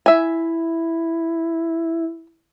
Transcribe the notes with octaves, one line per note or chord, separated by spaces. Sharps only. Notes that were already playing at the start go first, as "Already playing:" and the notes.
E4 E5 G#5